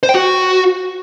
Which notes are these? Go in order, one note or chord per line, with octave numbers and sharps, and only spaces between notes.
C5
G5
F#4